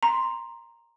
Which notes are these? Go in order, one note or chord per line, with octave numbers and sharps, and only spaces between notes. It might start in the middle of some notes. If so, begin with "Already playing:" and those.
A#5 C6